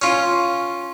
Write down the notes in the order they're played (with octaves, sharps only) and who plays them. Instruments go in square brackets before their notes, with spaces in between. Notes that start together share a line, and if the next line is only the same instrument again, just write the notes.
[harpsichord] C#4 F4